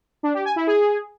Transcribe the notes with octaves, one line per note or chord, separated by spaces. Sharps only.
D4
G4
G#5
E4
G#4